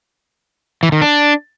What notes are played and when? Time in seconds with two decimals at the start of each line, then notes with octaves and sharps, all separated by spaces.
0.83 E3
0.92 D#3
1.02 D4